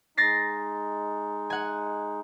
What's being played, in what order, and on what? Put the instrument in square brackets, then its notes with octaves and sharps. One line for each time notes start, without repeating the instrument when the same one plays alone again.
[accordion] G#3 D#4 [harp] A6 A#6 C7
[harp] F#5 G#5